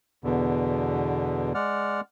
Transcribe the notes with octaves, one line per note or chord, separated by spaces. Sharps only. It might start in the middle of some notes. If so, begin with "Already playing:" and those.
E2 B2 D3
G#3 D5 F#5 F6